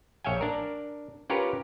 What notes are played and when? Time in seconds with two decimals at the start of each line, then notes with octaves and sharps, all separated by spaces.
0.24 A#1 C#5 E5 F5 G5 G#5
0.41 D4 A#4
1.30 C#4 F4 G4 A#4 B4 C#5